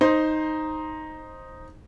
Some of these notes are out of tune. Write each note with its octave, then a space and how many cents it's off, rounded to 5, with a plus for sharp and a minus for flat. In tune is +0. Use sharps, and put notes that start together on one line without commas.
D#4 +0 C5 +10